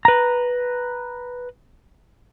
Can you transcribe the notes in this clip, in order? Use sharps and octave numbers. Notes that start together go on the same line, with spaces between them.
B4 A#5